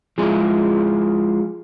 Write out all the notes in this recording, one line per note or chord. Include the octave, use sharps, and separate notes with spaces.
F3 G#3 E4 G#4